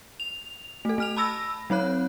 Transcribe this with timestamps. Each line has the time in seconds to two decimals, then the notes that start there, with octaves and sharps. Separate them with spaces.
0.20 F7
0.85 A3 A4
0.98 A3 F6 F7
1.17 A5 B5 E6 A#6
1.70 F#3 C4 C#5 F#6